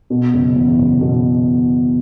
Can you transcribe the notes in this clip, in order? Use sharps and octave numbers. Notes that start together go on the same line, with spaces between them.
B2
F#1
E2
F#1
B2